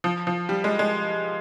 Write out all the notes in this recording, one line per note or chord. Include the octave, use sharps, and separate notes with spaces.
F3
F3
G3
G#3
G#3